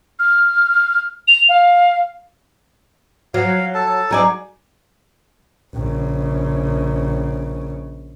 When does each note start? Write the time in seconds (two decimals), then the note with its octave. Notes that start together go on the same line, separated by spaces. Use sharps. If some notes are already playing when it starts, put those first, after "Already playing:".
0.19 F6
1.28 F7
1.49 F5
3.34 F#3 F5
3.74 A4 A5
4.11 F#3 D#4 G#4 D5
5.74 A#1 C#3